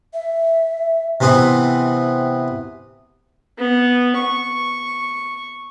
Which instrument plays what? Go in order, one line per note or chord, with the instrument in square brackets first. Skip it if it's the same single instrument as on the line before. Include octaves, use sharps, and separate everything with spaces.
[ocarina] E5
[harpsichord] C3 E3 B3 C4
[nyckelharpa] B3
C#6